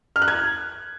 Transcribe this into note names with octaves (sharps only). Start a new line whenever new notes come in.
F6
F#6
G#6